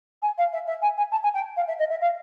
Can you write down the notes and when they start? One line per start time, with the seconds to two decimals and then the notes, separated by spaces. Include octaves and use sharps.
0.22 G#5
0.38 F5
0.53 E5
0.67 E5
0.82 G#5
0.97 G#5
1.12 A5
1.23 G#5
1.34 G5
1.57 F5
1.68 E5
1.79 D#5
1.90 E5
2.01 F5